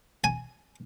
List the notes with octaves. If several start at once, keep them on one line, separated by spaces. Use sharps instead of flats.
G#5